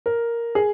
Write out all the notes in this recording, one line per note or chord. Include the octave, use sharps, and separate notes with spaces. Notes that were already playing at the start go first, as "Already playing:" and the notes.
A#4
G#4